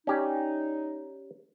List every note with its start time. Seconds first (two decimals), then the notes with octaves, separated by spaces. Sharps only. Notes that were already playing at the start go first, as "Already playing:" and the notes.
0.07 C#4 D#4 G4 D5